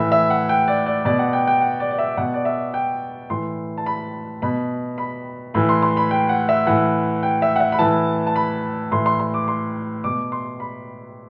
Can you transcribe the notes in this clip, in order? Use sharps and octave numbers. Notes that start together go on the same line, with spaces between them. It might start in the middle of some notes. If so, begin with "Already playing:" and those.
Already playing: A2 E3 E5
E5
F#5
G5
D5
D5
B2 D5
F#5
G5
G5
F#5
D5
D5
E5
B2 F#5
D5
E5
G5
A2 E3 C6
A5
B5
B2 B5
B5
A2 E3 B5
C6
C6
B5
G5
F#5
E5
A2 E3 F#5
G5
E5
F#5
E5
B5
A2 E3 A5
A5
B5
A2 E3 C6
C6
C6
D6
C6
B2 D6
C6
B5